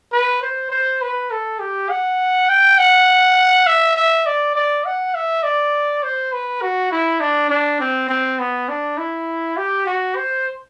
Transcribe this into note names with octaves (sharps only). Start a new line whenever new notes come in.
B4
C5
C5
B4
A4
G4
F#5
G5
F#5
E5
E5
D5
D5
F#5
E5
D5
C5
B4
F#4
E4
D4
D4
C4
C4
B3
D4
E4
G4
F#4
C5